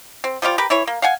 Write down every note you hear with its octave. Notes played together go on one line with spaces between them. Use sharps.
C4
F3 G3 F4 G4
G4 A#4 B4
E3 E4 C#5
A#3
F5 F#5 G#5